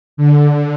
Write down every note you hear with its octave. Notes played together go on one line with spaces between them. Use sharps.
D3